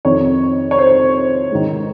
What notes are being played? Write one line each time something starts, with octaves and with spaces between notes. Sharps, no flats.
F2 C3 D#3 C#5
C#5
C5
G#2 D#3